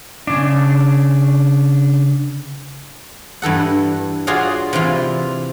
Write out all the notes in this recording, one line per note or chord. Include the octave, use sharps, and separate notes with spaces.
C#3 D4
G2 E3 A4 F#5
F4 F#4 G#4 C#5 D5 F5
C3 E3 F4